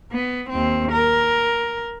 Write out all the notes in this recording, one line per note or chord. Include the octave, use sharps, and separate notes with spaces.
B3
D#2 C4
A#4